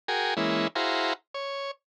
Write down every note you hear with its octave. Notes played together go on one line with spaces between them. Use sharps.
F#4 G#4 A#4 G5 G#5
E3 G#3 A#3 C#4 E4
E4 F#4 G#4 C5 F5 A#5
C#5